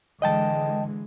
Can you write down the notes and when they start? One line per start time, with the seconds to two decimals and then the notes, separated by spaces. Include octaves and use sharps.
0.22 D3 E3 G#3 D#5 G5 A5